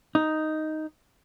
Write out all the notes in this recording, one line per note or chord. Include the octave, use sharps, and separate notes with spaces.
D#4